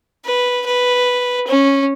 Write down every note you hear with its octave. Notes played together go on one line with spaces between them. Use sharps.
B4
B4
C#4